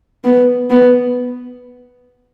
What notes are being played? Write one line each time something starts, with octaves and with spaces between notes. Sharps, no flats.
B3
B3